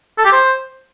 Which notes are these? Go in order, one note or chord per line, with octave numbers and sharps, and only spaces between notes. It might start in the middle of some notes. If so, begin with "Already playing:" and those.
A4
G4
C5